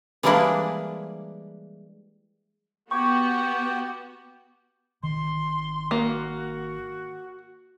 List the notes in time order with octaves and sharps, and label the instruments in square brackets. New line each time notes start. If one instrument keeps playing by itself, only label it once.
[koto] E3 G3 G#3 A#3 D4 E4
[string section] B3 F#4 [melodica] G4 G5 [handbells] C#6 G#6
[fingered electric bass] G#1 D#3 [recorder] C6
[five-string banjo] A#3 [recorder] F#4